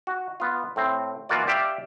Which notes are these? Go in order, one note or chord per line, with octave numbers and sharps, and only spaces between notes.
F#4
B3 F4
A2 C4
E3 A#3 F4 F#4 D5
G4 D5 E5 F5 G5